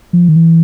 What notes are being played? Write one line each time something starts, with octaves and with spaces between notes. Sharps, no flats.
F3
D#3
E3